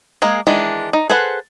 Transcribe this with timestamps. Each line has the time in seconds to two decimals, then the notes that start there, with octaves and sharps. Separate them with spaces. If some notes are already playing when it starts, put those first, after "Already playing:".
0.22 G#3 A#3 G#4
0.47 D#3 E3 G#3 D4
0.93 D#4
1.10 G#4 A4 B4 C5 F#5